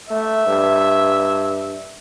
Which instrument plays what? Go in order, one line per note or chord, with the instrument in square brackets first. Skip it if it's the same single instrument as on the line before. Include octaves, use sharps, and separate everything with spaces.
[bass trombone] A3 [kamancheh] E5
[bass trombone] G2